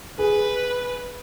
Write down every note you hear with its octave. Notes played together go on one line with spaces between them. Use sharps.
G#4 B4